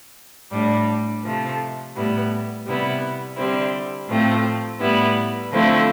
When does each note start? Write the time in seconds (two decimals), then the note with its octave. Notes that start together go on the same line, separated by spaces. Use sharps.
0.51 A2 G3 D4
1.23 C3 F3 A3
1.94 A2 G3 B3 E4
2.66 C3 G3 B3 E4
3.37 D3 G3 C4 E4
4.08 A2 F3 A3 C4
4.79 A2 G3 B3 E4
5.51 D3 F3 A3 C4 E4